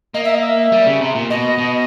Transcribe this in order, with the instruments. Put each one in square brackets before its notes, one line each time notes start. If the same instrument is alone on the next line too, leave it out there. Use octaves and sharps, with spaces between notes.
[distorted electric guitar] A#3 [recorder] D#5
[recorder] E5
D#5
E5
[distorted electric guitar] G3
C#3
C3
A#2
[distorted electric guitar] B2 [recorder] D#5
[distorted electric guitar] B2